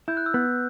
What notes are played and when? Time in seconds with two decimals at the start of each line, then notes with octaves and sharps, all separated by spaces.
0.08 E4 G6
0.17 F#6
0.26 E6
0.34 B3 F#6